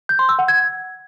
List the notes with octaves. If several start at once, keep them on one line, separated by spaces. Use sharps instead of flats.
G6
C6
E6
F#5
G#6